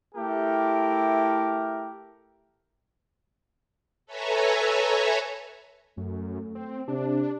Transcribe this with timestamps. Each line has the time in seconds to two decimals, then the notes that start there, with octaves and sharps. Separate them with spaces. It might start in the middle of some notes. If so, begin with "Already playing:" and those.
0.15 A3 E4 G4 A4 A#4
4.06 A4 B4 C#5 E5 G#5 A#5
5.97 F#2 A3
6.55 C4
6.88 C3 D4